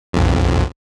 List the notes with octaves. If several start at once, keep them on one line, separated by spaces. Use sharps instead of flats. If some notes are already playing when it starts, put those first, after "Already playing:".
B1 F2